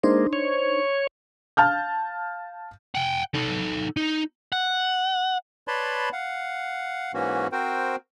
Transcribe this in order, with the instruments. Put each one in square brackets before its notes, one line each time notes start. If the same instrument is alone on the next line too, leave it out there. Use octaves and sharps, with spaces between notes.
[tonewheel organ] G#3 A#3 [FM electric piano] D4 D#4 C5
[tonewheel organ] C#5
[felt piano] F5 A5 F6 G6
[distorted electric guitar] F#5 G5
D#4 A4
D#4
[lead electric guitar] F#5
[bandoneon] B4 C#5 D5 A5 B5 C6
F5 F#5
G#2 E3 A#3 C#4 F#4
C4 F#4 A#4 C5 G5